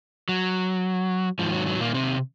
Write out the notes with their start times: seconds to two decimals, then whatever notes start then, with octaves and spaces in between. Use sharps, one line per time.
0.29 F#3
1.39 G#2 D#3 F3
1.53 F#3
1.67 F#3
1.80 A#2 A#3
1.94 C3 C4